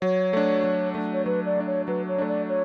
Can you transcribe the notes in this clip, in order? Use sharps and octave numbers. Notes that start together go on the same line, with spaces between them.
F#3 C#5
A3 D4
F#3
A3 D4
C#5
F#3 B4
D5
A3 D4
C#5
F#3 B4
C#5
A3 D4
D5
C#5